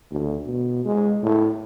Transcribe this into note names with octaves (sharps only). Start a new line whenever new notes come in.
D2
B2
G#3
A2